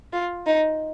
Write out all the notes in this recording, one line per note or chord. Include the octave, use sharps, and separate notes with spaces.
F4
D#4